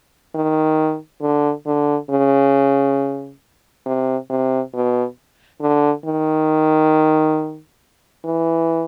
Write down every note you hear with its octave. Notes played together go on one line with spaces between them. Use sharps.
D#3
D3
D3
C#3
C3
C3
B2
D3
D#3
E3